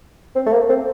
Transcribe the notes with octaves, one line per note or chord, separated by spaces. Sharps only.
C4
A3
A#3
C4